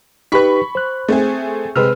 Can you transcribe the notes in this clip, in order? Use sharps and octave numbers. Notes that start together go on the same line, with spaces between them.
D#4 G4 B4 B5 C#6 B6
C5 F#6
A3 C4 G#4
C3 G#3 C4 B4 E6 F6